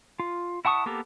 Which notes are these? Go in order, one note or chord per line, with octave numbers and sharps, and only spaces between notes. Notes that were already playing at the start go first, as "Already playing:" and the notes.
F4
E4 F#5 A5 C#6 D#6
A#3 B3 G4 A4 A#4